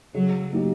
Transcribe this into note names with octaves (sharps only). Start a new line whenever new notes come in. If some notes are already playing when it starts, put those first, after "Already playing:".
C#3 F#3
F#3 A#3 D#4 G4